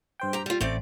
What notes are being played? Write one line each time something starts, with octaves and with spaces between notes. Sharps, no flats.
G2 C5 G5
G4 A#5
G3 F4
A1 A3 C4 D5